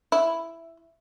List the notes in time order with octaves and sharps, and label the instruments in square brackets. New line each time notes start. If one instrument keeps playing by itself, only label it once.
[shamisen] E4